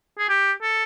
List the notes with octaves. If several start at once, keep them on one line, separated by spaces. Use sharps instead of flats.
G#4
G4
A4